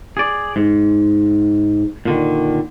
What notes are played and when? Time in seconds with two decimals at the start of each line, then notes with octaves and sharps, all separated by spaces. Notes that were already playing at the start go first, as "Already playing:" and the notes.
0.17 G#4 D5
0.56 G#2
2.05 A#2 D3 D#3